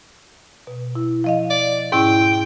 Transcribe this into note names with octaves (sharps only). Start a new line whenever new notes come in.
B2
E4
F3 D#5 F5
D5
G#2 C#4 E4 G5